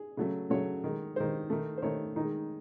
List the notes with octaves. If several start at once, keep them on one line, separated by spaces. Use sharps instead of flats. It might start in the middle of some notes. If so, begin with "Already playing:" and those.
Already playing: G#4
C#3 F#3 A3
C#3 F#3 A3 C#5
D#3 G#3
D#3 G#3 C5
D#3 A3
C5
D#3 A3 C#5
D#3 G#3 D#4